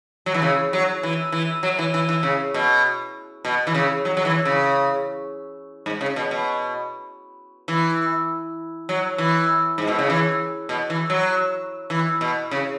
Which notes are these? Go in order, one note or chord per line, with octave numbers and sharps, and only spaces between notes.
F#3
E3
C#3
F#3
E3
E3
F#3
E3
E3
E3
C#3
B2
B2
E3
C#3
F#3
F#3
E3
C#3
G#2
C#3
B2
B2
E3
F#3
E3
G#2
B2
C#3
E3
B2
E3
F#3
E3
B2
C#3